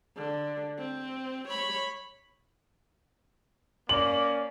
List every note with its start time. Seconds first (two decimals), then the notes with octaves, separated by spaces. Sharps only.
0.17 D3
0.78 C4
1.48 C#5 B5
3.89 A#3 C#4 D5 F#7